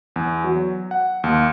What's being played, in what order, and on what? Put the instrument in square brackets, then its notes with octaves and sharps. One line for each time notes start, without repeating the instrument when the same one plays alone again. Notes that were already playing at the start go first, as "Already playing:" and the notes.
[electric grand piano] E2
F#3
F#5
D#2